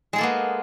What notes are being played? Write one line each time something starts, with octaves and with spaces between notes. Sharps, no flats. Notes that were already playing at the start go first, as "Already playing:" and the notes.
G#3 A#3 B3 G#4 A4